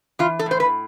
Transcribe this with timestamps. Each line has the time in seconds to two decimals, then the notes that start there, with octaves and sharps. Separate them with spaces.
0.19 E3 F4
0.39 A4
0.46 A2 C5
0.60 B4